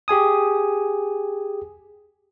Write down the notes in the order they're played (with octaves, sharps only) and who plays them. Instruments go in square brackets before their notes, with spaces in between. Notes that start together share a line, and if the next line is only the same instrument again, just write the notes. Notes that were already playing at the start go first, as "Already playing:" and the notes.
[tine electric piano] G4 G#4 G#5 D#6